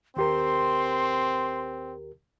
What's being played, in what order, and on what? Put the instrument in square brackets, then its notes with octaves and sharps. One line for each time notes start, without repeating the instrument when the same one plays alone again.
[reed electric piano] D#2 G4 A#4 [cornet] C4 [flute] C6